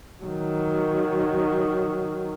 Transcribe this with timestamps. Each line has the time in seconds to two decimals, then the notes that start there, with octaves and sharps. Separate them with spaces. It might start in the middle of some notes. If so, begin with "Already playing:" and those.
0.23 D#3 F#3